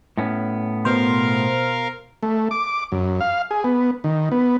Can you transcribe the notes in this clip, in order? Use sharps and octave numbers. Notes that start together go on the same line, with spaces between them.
A2 B3 C#4
B2 A#4 C5 F5
A3
D6
F#2
F5
G#4
B3
D#3
B3